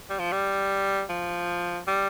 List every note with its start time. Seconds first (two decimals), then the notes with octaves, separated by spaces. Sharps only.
0.10 G3
0.19 F3
0.32 G3
1.09 F3
1.87 G3